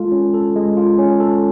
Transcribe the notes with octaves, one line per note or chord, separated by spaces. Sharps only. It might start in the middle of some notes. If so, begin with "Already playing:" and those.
Already playing: G#3 F4 A4
C#4
A4
G#3
F4
C#4
A4